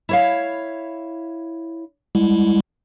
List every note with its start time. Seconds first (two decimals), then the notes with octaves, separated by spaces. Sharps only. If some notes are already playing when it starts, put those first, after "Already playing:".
0.09 E4 C#5 F5
2.15 G3 G#3 E4